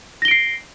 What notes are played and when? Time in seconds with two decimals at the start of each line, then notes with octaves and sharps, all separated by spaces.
0.22 A#6
0.25 G7
0.28 D7
0.31 C7